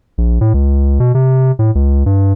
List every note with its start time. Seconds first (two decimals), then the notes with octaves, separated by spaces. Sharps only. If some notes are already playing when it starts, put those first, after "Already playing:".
0.18 A#1
0.41 A2
0.54 C#2
1.00 B2
1.15 C3
1.59 A2
1.75 C#2
2.06 G2